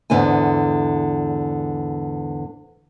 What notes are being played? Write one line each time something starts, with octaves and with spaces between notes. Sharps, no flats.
E2 G#2 D3 B3 E4 G#5